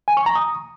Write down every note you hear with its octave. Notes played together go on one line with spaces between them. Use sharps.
G#5
C#6
A#5
D#6